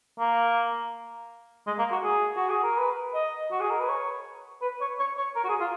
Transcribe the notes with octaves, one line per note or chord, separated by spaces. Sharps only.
A#3
G#3
A#3
F#4
G#4
F#4
G#4
A#4
B4
D#5
F#4
G#4
A#4
B4
C#5
B4
C#5
C#5
C#5
A#4
F#4
G#4
F4